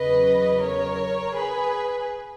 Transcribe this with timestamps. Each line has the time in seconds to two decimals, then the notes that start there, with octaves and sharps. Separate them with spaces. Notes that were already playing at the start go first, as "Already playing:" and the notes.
Already playing: E2 C#3 F#3 B4 D#5
0.61 A#4 C#5
1.35 G#4 B4